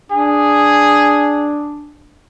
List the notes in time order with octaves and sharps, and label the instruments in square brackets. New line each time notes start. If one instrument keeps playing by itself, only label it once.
[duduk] D4 [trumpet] G#4